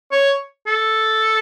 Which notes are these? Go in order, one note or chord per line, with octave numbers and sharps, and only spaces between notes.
C#5
A4